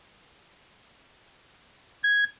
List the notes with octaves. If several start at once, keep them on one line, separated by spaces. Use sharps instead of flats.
G#6